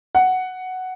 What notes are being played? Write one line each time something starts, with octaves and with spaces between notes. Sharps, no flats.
F#5